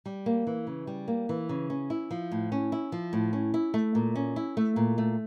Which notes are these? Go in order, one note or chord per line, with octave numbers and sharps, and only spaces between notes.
G3
A#3
E3
C#3
G3
A#3
E3
C#3
C#4
E4
F3
A2
C#4
E4
F3
A2
C#4
E4
A3
A#2
C#4
E4
A3
A#2
A3